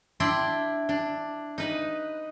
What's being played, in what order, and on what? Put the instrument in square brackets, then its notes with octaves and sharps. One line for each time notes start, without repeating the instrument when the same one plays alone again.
[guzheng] D4 E4 D5 G5 C6
D4
D#4 B4